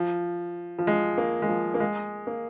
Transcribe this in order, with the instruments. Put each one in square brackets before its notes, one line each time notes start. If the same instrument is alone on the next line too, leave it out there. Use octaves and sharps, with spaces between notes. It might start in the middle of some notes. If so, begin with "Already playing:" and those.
Already playing: [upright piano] F3
F3
G#3
A#3
G#3
F3
A#3
G#3
A#3